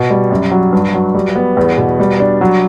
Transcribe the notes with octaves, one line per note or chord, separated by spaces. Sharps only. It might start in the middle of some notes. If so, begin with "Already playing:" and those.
Already playing: B2
G3
F#2
F#3
G2
F#3
G3
B3
E2
B2
G3
D4
F#3